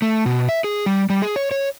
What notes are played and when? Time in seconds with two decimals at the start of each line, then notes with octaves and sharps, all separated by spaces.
0.02 A3
0.26 B2
0.49 E5
0.64 G#4
0.86 G3
1.10 G3
1.22 G#4
1.36 C#5
1.51 C#5